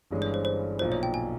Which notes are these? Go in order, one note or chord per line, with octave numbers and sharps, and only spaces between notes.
G1 G2 E3 G#3 C#4
C#5
C5
C5
B1 A#2 F3 C5
C#5
G5
G#5